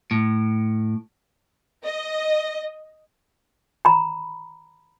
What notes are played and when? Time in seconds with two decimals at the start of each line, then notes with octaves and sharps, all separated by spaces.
0.11 A2
1.85 D#5
3.85 A#5 B5